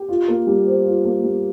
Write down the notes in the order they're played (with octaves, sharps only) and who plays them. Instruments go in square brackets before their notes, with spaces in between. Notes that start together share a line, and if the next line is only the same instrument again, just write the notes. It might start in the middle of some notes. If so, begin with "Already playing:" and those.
Already playing: [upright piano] G4
F4
A#3
G3
C5
F4
A#3
G3